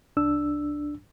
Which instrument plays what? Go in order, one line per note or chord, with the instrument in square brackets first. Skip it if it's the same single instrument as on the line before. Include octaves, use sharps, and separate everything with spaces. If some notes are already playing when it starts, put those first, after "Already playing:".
[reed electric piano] C2 D4 E6